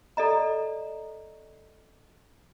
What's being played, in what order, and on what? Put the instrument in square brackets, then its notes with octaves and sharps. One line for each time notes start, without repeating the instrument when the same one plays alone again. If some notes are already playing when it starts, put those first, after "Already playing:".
[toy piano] A4 D5 D#5 A#5